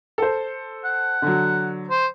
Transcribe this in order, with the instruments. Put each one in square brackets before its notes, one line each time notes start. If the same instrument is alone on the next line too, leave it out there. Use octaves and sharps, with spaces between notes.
[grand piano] A4 C5
[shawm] F#5
[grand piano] D3 F#3
[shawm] C5